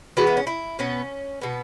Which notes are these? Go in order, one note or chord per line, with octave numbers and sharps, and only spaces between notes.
E3 G#3 B3 F#4
E4
C#4
E4
B2 B3 C#4
B2 B3